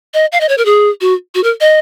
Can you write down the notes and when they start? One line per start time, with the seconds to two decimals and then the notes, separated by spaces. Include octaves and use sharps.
0.14 D#5
0.32 F5
0.41 D#5
0.49 C#5
0.58 A#4
0.65 G#4
1.01 F#4
1.35 F#4
1.44 A#4
1.61 D#5